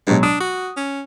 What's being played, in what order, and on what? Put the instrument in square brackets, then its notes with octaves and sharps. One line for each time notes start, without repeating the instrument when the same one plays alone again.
[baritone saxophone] G2 [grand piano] B2 F#3 G#3
[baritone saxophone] D4 [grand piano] D#6
[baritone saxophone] F#4
C#4